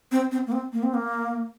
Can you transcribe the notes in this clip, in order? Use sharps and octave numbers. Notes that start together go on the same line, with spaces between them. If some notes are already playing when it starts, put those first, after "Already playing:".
C4
C4
A#3
C4
A#3
C4
A#3